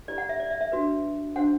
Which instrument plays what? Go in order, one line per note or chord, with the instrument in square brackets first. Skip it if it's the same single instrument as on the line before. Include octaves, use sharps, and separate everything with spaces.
[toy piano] E4 G4 B4 D5
F#5
E5
D5
E5
E5
D4 F#4 B4
D4 F#4 C5 F#5